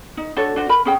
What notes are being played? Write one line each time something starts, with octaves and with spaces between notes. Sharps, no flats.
D#4
D4 F#4 A4 C#5
D4 F#4 C5
A#4 B5
C#4 G#4 G5